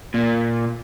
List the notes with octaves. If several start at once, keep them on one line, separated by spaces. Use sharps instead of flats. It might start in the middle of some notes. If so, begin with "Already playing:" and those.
A#2